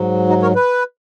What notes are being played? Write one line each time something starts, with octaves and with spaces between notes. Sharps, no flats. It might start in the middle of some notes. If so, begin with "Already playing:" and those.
Already playing: G#2 F#3
D#4 F#4
A#4 C#5
B4